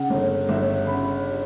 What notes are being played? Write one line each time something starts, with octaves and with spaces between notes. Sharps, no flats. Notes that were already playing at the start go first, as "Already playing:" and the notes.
Already playing: C#3 F#5
G1
G1 E5
C#3 B5